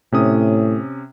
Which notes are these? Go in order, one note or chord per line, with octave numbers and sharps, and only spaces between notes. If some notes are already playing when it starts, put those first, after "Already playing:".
A2 C3 C#4 D#6